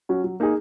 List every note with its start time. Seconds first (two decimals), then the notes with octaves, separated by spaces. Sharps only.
0.09 F#3 C#4 F#4
0.24 F#3
0.40 A#3 D#4 G#4